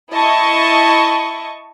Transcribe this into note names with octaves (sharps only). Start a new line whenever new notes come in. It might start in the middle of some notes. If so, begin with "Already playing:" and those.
E4 D#5 A5 C#6